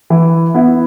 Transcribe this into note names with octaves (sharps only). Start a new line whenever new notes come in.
E3
B3 E4